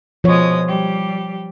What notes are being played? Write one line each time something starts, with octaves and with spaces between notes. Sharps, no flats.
B2 F3 G#3 C#5 D#6
G3 G4